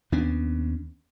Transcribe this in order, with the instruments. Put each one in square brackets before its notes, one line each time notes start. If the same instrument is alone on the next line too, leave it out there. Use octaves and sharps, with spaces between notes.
[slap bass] D#2 B3 C#4 D4